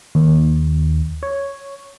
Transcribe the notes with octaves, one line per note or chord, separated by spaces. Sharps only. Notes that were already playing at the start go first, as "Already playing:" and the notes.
D#2
C#5